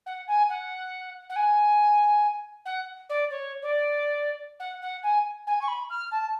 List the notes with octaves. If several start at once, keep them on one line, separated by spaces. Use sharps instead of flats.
F#5
G#5
F#5
F#5
G#5
F#5
D5
C#5
D5
F#5
F#5
G#5
G#5
C#6
B5
F6
A5